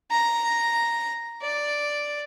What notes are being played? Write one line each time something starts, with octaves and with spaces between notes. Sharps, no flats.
A#5
D5